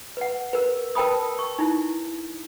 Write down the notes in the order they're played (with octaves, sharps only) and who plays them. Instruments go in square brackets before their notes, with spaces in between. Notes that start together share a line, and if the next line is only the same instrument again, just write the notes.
[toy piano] B4 F#5
A#4 B4
A#4 B4 G5 A5 B5 D#6
C#6
D#4 E4